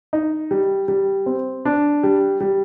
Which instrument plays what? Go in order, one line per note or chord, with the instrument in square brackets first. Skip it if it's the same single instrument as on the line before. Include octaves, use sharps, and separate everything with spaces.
[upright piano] D#4
G3
G3
C4
D4
G3
G3